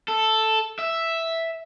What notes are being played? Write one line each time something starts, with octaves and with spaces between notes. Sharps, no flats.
A4
E5